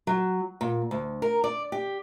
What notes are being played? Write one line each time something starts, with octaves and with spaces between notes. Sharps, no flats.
F#3
A#2
D2
A#4
D5
G4